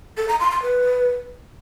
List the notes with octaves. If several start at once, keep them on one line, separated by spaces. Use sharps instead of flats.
A4
A#5
C6
C6
B4